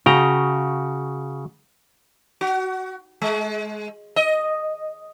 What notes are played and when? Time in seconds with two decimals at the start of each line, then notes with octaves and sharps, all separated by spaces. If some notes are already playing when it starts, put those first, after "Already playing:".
0.06 C#3 F#4 G5 A#5
2.41 F#4
3.22 G#3
4.16 D#5